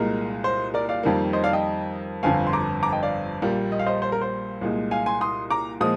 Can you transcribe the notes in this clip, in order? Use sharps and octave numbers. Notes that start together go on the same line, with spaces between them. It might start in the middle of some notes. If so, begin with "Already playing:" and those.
Already playing: C2 A#2 G#3 A#4
C5
A#4 D5
D5 F5
F2 D#3 G3 A#3
C5 D#5
D5 F5
D#5 G5
G1 F2 D3 F5 G#5
C6
A#5 D6
A#5 D6
D#5 G5
D5 F5
A#1 A#2 G3 A#3
D#5
F5
C5 D#5
C5
A#4
C5
C2 A#2 G#3
F5 G#5
G#5 C6
C6 D#6
A#5 D6
A#2 F3 G#3 D#6